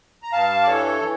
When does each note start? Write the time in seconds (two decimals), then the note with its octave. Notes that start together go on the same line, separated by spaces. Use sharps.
0.22 A#5
0.32 G2 F5 A5
0.63 D5
0.67 E3 A4 C#5
1.02 E3